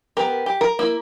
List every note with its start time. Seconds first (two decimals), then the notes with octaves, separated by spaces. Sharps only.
0.17 B3 G4 A#4
0.46 G4
0.61 A#4
0.79 A#3 E4